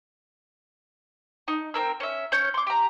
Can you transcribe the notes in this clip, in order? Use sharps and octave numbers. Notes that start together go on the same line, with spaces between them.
D#4
C4 D#4 A#4 E6
C#4 E5
C#4 C#5 G6
C6 D6
G4 A#5